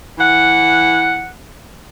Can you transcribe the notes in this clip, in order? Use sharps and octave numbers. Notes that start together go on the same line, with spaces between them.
E3 F#5